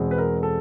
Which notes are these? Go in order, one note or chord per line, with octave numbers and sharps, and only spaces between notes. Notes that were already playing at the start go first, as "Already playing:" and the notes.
Already playing: E2 B2 G#3 C4
B4
A#4
A4